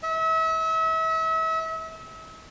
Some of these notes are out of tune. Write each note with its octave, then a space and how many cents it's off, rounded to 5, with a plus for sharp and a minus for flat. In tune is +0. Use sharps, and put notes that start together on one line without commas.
E5 -35